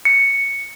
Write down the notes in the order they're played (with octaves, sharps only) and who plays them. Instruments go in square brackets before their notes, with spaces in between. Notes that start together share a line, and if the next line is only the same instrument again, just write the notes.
[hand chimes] C#7